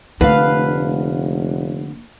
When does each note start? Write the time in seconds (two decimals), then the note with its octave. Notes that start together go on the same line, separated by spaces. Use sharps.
0.21 F1 D3 A3 A#3 B4 F5